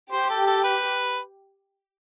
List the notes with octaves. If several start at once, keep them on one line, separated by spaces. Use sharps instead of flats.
G4 C5
A4
A4
B4